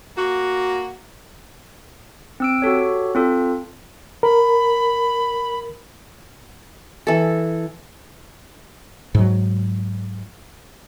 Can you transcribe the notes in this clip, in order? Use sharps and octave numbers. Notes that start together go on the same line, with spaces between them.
A#3 F#4
C4 E6 D7
F#4 G4 A4 C#5
C4 F4 A4
A#4 B5
E3 A4
G#2 F#3